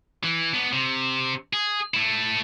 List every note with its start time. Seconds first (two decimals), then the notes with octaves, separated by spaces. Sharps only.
0.23 E3
0.53 B3 D4
0.73 C3
1.53 G#4
1.94 A3 E4